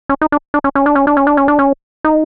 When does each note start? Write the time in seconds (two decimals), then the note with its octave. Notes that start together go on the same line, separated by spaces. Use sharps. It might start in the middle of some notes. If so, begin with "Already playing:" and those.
0.09 C#4
0.21 D#4
0.32 D4
0.54 D4
0.64 C#4
0.75 C#4
0.86 D4
0.95 C#4
1.07 D4
1.17 C#4
1.27 D4
1.37 C#4
1.48 D4
1.59 C#4
2.04 D#4